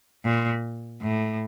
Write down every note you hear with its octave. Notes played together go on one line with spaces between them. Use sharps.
A#2
A2